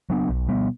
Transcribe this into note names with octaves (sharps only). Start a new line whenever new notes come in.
F#3 B3 D4
B1
B2 G3 B3